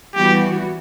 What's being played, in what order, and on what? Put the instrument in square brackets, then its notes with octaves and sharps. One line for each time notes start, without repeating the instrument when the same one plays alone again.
[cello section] E3 G3 B3 F#4 [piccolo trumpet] G4